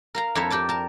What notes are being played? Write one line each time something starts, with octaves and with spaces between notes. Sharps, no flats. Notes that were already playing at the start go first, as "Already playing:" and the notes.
A#4 F5 A#5
F2 E4 A4 A#4 C#5 E5
G4 A#4 D5 A5
A#4 A5